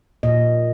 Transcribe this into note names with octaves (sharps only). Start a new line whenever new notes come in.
A#2 D#5